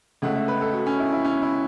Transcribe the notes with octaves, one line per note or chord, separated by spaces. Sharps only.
C#2 C#3 A3 F#5
E5
B4
A4
F#4
C#4
E4
E4
C#4
E4